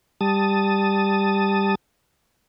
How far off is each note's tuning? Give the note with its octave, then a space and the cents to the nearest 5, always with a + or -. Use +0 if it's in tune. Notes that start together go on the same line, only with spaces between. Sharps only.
G3 +10 A5 +0 D#6 +5